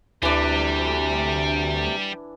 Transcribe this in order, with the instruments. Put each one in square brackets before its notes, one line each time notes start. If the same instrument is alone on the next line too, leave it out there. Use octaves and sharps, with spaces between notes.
[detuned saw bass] D2 [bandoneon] C3 [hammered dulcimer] E3 D4 [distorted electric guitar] G3